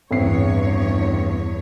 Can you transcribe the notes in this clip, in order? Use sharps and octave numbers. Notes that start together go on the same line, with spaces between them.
A1 E2 G2 C4 C#5 C7